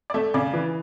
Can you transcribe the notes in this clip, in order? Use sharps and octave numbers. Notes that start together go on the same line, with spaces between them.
D5
A3 E5
C#3 D5
E3